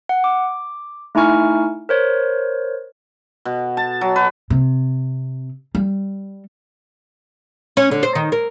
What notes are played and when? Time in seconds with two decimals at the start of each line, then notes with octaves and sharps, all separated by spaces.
0.09 F#5
0.24 D6
1.15 A3 D#4 E4 G#5 C#6 F6
1.89 A#4 C5 C#5
3.45 B2
3.77 A5
4.01 F#3
4.16 B4
4.50 C3
5.75 G3
7.77 C#4
7.91 D3
8.03 C5
8.15 D#3
8.32 A#4